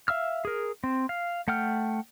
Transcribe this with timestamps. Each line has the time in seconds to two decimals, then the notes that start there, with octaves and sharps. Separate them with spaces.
0.08 E5 F5 E6 F6
0.45 G#4 A#4
0.84 C4
1.09 F5
1.48 A3 F#5 G5 F6